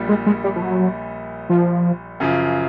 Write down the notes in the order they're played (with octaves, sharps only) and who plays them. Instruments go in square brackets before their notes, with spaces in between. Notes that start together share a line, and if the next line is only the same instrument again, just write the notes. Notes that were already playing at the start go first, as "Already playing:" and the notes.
Already playing: [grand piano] A#1 A#2 G3
[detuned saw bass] G#3
G#3
G3
F3
F#3
F3
[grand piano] F#2 C#3 F3